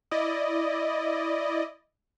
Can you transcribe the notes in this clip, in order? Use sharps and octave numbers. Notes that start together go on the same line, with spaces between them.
E4 D5 D#5